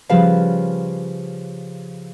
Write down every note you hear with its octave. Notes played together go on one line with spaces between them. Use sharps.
C#3 F3 G3 B4 F5 A5